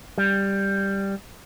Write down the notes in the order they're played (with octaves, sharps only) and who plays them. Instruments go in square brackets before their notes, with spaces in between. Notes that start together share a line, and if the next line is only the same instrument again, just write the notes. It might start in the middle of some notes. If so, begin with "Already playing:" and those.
[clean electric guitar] G3